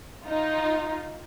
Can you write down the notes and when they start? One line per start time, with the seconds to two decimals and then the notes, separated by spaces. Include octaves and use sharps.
0.25 D#4 F4